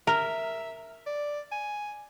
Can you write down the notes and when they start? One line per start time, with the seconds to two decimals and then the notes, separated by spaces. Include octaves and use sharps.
0.07 A#4 E5
1.06 D5
1.51 G#5